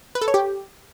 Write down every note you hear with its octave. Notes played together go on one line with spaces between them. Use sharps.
B4
A4
C#5
G4